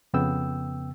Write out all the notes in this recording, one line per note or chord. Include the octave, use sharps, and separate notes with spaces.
F2 C#3 B3 G5 E6